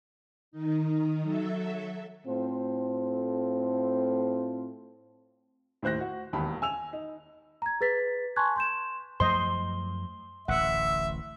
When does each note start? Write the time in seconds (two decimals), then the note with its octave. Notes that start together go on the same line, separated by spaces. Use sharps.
0.52 D#3 D#4
1.22 F#3 A4 E5
2.27 A2 C4 F4 A4 C5
5.82 D#2 A2 C5 F#6 A#6
6.00 F#4
6.33 E1 D#2 A5 B5
6.62 G#5 E6 F7
6.93 D#4
7.62 A#5 G#6
7.81 G#4 B4 A6 B6
8.36 G#5 A5 C6 C#6 F#6 G#6
8.56 C6 G6 E7
9.20 F#2 F3 A3 C5 D#5 C6
10.48 D1 A1 E5 F#5